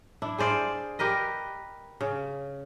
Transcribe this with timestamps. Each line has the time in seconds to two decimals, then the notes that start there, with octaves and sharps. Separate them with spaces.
0.22 D4 E4
0.38 G#4 C5 D5 F5
0.99 G4 A#4 B4 D#5
2.01 C#3